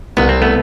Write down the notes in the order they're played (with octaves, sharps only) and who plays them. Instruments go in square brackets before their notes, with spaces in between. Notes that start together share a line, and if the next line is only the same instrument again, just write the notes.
[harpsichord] C2 [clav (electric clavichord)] B3
[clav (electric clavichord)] C4
A3 B3